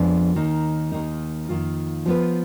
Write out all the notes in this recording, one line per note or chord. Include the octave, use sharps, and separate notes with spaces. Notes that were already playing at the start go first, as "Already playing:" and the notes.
Already playing: F2 F3 G#3 B3 D4
D#2 D#3 A#3 D#4
D#2 D#3 A#3 D#4
F2 D#3 A#3 F4
F3 B3 F4 B4